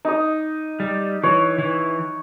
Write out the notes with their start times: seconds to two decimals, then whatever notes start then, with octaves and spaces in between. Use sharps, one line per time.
0.05 D#4 D#5
0.80 G3
1.23 E3 C#5
1.58 E3